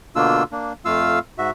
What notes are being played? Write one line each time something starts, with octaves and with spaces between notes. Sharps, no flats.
B2 D3 A#3 D4 F4 E6
A#3 D4
F2 A3 F4 F5 E6
G#2 F#4 E5